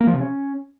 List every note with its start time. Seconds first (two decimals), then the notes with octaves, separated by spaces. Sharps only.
0.01 A#3
0.07 F3
0.14 C3
0.20 C#4